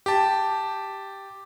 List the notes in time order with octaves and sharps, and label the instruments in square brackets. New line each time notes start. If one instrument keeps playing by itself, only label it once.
[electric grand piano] G4 A5